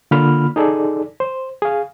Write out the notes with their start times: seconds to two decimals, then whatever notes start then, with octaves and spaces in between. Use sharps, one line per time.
0.11 D3 A#3 F4 B5 F6
0.56 D#4 G#4 A4 D5
1.20 C5
1.62 G#4 F5